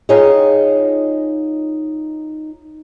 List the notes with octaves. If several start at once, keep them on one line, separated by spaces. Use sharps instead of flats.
D#4 F4 G4 G#4 C#5 D#5